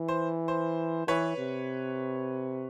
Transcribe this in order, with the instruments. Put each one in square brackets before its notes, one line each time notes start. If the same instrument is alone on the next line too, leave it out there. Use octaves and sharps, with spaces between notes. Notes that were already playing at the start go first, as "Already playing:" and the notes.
Already playing: [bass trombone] E3
[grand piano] C5
C5
[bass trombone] E3 [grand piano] B4 C#5
[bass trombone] C3